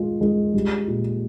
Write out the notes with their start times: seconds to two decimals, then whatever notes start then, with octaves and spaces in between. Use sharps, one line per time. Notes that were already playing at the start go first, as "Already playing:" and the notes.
Already playing: G#3 F4
0.21 G#3
0.53 G3
0.87 A#2